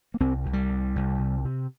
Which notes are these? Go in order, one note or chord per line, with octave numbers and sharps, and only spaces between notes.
A#3
C2 C4
C2
G3
C3
C2
C3
C3